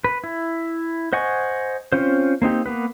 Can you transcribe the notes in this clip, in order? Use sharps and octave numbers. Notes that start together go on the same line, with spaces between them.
B4
E4
C5 D#5 F#5 G#5 C#6
C4 C#4 F4 C5
A#3 C4 D#4 G4
A#3 B3 B4